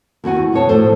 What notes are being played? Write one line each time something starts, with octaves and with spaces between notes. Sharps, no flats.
D#2 E4 F#4 F#5 G#5
F2 B2 C#5 A5
A2 F3 A4 C5